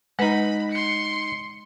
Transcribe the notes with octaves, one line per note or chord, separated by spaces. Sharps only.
G#3 D#4 B4 F#5 B5
C6 C#7